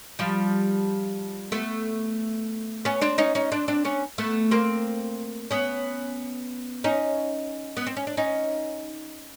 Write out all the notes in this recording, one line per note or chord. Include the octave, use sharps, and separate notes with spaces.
F3 G3
A3 B3
B3 C#4
C4 D4
C#4 D#4
C#4 D#4
C4 D4
C4 D4
B3 C#4
A3 B3
A#3 C4
B3 C#4
C#4 D#4
B3
C4
C#4
D4
C#4 D#4